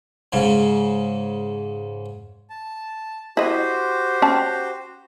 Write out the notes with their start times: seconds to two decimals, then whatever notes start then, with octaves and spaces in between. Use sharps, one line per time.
0.33 G#2 C#3
2.50 A5
3.37 E4 F#4 G4 C5 D#5
4.22 C#4 G5 A5